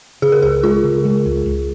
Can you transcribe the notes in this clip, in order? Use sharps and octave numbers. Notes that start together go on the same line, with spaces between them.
C#3 G#4
A#4
C#2 G#4
G#3 F4
C#3
G#3
C#2
C#2